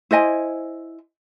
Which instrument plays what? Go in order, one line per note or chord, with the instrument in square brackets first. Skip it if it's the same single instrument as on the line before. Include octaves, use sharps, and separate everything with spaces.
[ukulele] E4 C5 D#5 G#5